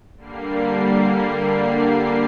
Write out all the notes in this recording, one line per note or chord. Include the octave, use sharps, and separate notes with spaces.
D3 G3 A#3 C7